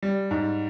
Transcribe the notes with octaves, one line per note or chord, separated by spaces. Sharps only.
G3
G#2